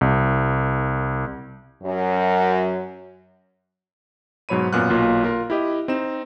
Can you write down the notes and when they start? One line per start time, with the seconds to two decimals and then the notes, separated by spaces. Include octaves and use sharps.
0.01 C2
1.83 F#2
4.49 G#2 B2 F#3 C#5 B5 D#7
4.73 F#2 A#2 B3 F6 F#6
4.90 B1 A#2 A#3 F4
5.24 F4 A#4
5.50 E4 G4 D#5
5.88 C4 D#4 E7